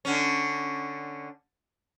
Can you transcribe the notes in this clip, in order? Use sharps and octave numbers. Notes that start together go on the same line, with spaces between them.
D3 C#4